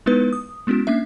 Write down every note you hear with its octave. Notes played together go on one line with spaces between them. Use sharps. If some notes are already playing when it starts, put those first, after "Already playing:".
G#3 B3 D#4 E4 B4
D#6
G#3 B3 C#4 E4 F#4
A#3 C#4 D4 E5